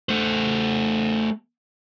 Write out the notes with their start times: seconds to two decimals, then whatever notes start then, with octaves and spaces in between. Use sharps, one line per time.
0.09 A3 C5